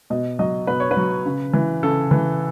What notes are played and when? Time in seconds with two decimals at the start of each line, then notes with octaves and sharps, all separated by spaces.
0.10 B2 D#5
0.39 F#3 D#5
0.67 B2 B4
0.80 C#5
0.91 B4
0.97 F#3
1.26 C#3
1.54 E3
1.83 C#3 A4
2.11 E3